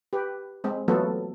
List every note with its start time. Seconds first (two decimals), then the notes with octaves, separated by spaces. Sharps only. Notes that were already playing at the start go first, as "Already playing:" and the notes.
0.13 G4 B4
0.64 G#3 C4
0.88 E3 F#3 A3 B3 F4 A4